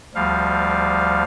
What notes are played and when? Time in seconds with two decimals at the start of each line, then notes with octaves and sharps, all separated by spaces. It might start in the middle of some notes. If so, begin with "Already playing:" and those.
0.15 D2 F3 G3 F5